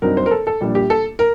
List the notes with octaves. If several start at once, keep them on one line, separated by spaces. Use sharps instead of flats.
G2 F#3 C4 D#4 A#4
C5
A#4
A4
A4
A#1 A#2 G3 D4
G4
A4
A#4